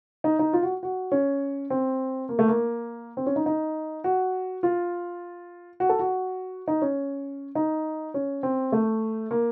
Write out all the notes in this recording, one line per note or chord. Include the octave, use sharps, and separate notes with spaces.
D#4
D#4
F4
F#4
F#4
C#4
C4
A#3
A3
A#3
C4
C#4
D#4
D#4
F#4
F4
F#4
A4
F#4
D#4
C#4
D#4
C#4
C4
A3
A#3